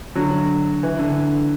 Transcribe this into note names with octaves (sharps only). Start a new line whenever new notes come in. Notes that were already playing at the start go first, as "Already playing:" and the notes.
D3 F#3
E3
D3